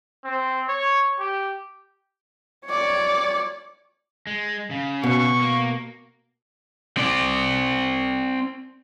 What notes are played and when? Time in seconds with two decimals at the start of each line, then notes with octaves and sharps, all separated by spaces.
0.24 C4
0.68 C#5
1.20 G4
2.66 C#5 D5
4.27 G#3
4.71 C#3
5.04 B2 C#6
5.41 A#3
6.97 C4 D5